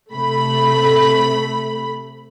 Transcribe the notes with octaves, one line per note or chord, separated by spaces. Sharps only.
C3 A3 B5